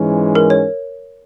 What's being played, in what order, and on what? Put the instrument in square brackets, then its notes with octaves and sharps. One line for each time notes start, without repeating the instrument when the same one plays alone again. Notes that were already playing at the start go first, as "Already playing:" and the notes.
Already playing: [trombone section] G#2 E3 G#3 C#4
[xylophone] A#4
C#5